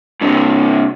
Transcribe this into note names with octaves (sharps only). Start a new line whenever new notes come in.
G2 C3